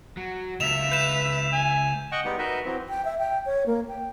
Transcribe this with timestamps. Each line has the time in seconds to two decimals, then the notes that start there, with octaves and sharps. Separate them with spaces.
0.17 F#3
0.60 C#2 E5 E7 F7
0.92 B4 G6 E7
1.53 G#5
2.12 D#5 F#5 G5 C#6
2.25 G3 G#3 B3 D#4 G4
2.38 D#4 F#4 A#4 B4 D#5 E5
2.65 E3 F#3 C4
2.89 G5
3.05 E5
3.19 G5
3.46 C#5
3.66 A#3
3.88 G5